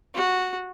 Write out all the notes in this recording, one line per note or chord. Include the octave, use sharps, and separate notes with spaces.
F#4